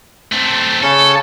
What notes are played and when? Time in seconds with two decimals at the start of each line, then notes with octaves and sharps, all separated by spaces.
0.32 A3 C4
0.83 C#3 C#4 A4